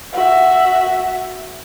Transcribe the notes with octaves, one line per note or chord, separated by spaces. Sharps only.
F#4 E5